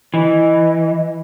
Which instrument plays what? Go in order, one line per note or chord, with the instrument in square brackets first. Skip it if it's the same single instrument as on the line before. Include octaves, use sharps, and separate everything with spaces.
[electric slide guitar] E3 [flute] D#5